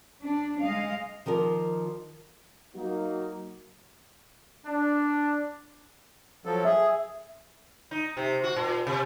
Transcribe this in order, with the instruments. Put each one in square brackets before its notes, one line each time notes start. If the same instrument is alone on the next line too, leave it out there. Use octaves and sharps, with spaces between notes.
[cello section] D4
G#3 D#5 F5
[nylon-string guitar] D#3 F3 F4 A#4 D5
[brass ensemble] F#3 A#3 D#4 F#4
[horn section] D4
[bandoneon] F3 F#3 A4
[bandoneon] G#4 [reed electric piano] E5
[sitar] D#4
C3
F#4
A#2
C3